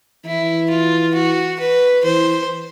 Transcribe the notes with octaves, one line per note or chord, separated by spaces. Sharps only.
E3 E4
F4
F#4
B4
E3 C5